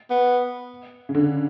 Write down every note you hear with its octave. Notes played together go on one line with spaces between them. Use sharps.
B3
C#3
D3